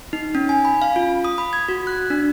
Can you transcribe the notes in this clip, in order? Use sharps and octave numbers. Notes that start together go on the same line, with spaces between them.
D#4
C#4
G#5
B5
F5
F4
D#6
B5
G#6
F#4
F#6
D4